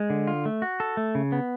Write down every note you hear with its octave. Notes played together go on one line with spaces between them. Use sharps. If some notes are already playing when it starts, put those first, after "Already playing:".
Already playing: G#3
D3
F4
A3
F#4
A4
A3
C#3
B3